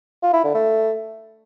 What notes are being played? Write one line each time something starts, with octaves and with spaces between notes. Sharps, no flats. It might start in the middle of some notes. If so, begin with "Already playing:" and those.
F4
E4
D3
A3